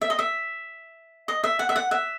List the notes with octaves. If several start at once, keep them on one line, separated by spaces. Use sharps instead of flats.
E5
D#5
E5
D#5
E5
F#5
E5
F#5
E5